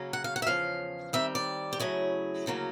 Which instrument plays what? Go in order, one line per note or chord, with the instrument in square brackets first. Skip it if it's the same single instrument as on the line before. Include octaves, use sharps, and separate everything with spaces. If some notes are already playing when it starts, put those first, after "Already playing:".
Already playing: [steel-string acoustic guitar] C#3 F#3 A#3 C#4
F#5
F5
F#5
E5
E2 C#3 F3 C#4 F5
D#3 G3 C4 E5
D5
G4
C#3 F#3 A3 C#4 E4 G#4
D2 C#3 F#3 A#3 C#4